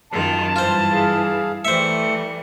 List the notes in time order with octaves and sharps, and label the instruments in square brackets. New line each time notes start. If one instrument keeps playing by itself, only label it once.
[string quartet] F#2 D#3 F4 [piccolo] A5
[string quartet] G2 E3 [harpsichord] F4 C5
[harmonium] G#4 F5
[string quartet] E3 G3 [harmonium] A3 [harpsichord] C5 E5 [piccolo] C#7